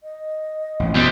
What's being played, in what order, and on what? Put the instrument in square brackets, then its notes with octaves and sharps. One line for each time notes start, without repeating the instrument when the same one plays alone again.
[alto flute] D#5
[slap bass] A1 F2
[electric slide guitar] B2 [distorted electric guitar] G3 C4